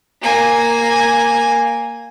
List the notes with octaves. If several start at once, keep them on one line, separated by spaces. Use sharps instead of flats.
A#3 G#5